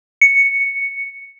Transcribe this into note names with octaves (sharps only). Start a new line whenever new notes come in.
C#7